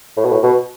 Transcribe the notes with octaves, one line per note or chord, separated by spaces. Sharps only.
A2
B2
A2
B2